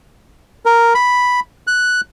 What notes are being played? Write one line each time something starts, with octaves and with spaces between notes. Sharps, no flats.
A#4
B5
F#6